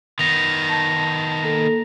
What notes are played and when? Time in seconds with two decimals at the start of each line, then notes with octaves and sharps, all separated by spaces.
0.19 D#3 B3 A#6 F7
0.69 A5
1.44 A#3 A4